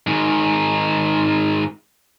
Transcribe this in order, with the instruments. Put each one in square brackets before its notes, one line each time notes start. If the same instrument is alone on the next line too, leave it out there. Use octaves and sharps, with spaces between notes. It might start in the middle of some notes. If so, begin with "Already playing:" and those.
[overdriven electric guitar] G#2 D#3